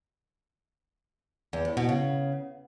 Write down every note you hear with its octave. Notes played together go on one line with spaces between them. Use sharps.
E2
A2
B2
C#3